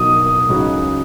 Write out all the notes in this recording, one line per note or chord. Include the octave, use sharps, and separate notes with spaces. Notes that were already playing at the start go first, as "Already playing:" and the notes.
Already playing: B2 F#3 D#4 F#4 D#6
C#2 C#3 F#3 D#4 F#4